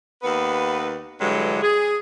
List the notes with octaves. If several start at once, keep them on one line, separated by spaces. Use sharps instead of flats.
D#2 B3 B4
G2 D3 E3 F#3 G#3
G#4